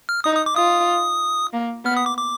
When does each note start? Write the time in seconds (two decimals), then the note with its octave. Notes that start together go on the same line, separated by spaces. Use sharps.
0.09 F6
0.24 D#4 D#6
0.35 D#6
0.46 D6
0.56 F4 D#6
1.53 A#3
1.85 B3 F6
1.97 D#6
2.06 D6
2.17 D6